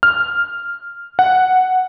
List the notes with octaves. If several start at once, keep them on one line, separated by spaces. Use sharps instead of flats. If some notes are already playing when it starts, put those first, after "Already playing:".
F6
F#5